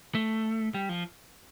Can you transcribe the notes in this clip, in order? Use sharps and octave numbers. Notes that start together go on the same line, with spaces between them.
A3
G3
F3